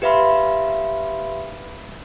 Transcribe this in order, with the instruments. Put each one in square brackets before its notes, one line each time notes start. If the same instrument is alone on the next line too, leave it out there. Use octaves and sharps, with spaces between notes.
[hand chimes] G4 B4 E5 F5 B5 C6